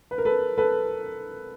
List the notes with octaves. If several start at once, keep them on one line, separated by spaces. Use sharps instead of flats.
B4
A#4
A4 B4
A4 B4